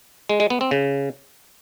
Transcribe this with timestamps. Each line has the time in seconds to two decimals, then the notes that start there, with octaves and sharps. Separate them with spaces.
0.29 G#3
0.40 G#3
0.50 B3
0.61 C4
0.71 C#3